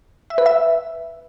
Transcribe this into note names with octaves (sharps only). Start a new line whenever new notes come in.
E5
B4
E5